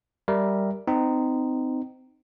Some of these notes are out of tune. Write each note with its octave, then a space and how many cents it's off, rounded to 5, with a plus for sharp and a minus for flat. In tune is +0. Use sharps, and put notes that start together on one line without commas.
G3 +0 A#4 +0 E5 +0
C4 -25 D#4 -10